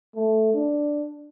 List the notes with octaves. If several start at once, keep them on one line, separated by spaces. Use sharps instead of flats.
A3
D4